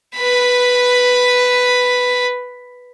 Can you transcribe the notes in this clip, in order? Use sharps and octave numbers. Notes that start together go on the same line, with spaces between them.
B4 B5